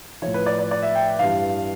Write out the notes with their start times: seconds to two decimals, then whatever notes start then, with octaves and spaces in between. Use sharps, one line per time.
0.22 A2 F3 C#5
0.34 B4
0.46 D5
0.58 D5
0.71 D5
0.83 E5
0.95 G5
1.19 G2 E3 F5